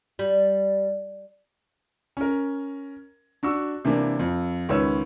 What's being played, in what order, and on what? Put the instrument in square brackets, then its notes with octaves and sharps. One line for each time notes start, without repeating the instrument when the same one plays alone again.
[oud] G3
[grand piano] C#4 A#4
D4 F#4 C#6 E6
C3 E3 A#3 D4
F2
C#2 D#3 B4 C#5 E6